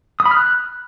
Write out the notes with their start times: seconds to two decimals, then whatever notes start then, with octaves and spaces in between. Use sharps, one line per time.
0.20 D#6
0.26 B5
0.31 F6
0.37 F#6